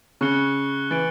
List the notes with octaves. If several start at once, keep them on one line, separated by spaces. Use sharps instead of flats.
C#3 C#6 F#6 C#7 G7
E3 A6 D7 F#7